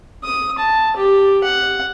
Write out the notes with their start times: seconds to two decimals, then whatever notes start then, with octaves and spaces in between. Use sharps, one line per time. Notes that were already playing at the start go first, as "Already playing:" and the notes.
0.24 D#6
0.58 A5
0.97 G4
1.44 F#5